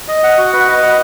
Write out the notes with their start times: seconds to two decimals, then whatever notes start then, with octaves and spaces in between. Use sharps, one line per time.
0.08 D#5
0.24 F#5
0.38 F#4
0.53 B4
0.68 D#5
0.82 F#5